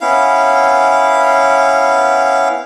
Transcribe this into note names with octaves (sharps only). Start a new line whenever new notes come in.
B3 C#4 E4 F5